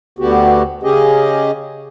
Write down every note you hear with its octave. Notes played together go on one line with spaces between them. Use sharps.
D2 D3 B3 F#4 G4
C#3 C#4 G4 G#4 D#5